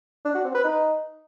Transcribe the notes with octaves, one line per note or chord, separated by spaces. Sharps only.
D4
F#4
C4
B4
D#4